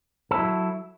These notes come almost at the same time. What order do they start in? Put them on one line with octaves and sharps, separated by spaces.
A4 E4 F#3